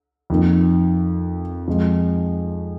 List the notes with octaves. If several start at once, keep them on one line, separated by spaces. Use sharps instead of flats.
F2 D#3 A#3
F2 F3 G#3